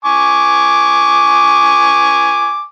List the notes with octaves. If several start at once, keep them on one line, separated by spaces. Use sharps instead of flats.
G#5 C#6 D6